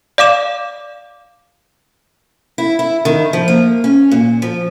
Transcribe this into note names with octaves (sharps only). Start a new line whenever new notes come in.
D5 F5 D6 E7
E4
E4
D#3
F3
A#3
C#4
A#2
F3